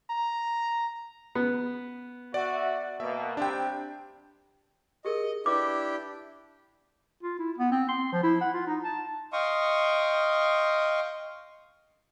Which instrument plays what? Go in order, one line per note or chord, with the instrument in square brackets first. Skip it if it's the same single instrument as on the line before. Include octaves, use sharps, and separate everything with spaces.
[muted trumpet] A#5
[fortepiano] B3
[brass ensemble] F#4 E5 [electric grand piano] D5
[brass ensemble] B2 A#3 [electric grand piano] E5
[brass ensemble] C3 G3 [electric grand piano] D4 G5
[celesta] G4 G#4 A#4 [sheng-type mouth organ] D#5
[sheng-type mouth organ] D4 E4 G4 [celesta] B4 [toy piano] D6
[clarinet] F4
E4
B3
C4
C6
F3
E4
F#5
F4
D#4
A5
[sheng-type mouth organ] D#5 F5 G5 C6 C#6 D#6